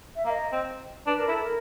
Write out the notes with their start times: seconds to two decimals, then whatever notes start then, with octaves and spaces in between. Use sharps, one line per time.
0.16 E5
0.25 A#3 F5
0.30 D#5
0.52 C4
1.07 D4 B4
1.19 A#4
1.28 E4
1.31 A4
1.43 A#4